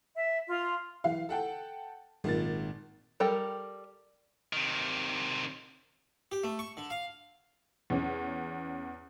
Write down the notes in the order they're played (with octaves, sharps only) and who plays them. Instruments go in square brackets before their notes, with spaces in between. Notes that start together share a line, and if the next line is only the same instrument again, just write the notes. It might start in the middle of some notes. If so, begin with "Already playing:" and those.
[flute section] E5
F4
[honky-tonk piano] E3 F5
A4 F#5 G5 A5
G#1 A#2 A6
[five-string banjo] G3 A4 A#4 G5
[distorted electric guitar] C3 D#3
[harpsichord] G4
A3
C#6
D3
F5
[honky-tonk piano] E2 C#4